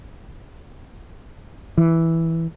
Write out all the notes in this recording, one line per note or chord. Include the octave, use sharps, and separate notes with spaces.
E3